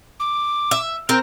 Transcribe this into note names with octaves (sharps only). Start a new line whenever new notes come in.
D6
E5
C4 A#4